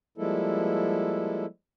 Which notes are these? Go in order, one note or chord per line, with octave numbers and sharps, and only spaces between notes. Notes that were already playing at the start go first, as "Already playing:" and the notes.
F3 G3 G#3 A#3 E4 A4